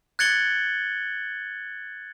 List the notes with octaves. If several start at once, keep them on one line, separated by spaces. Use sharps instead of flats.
F#6 G#6 A6 C#7 F#7 G7